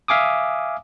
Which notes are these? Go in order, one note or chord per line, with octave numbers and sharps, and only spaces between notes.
E5 F5 G#5 D6 D#6